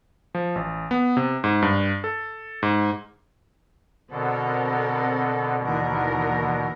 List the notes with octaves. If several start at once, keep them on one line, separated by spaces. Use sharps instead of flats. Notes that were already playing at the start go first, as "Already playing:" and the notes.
F3
A1
B3
C3
G#2
G2
A4
G#2
B2 D3 C4 A4 A#4
D#2 E3 A#4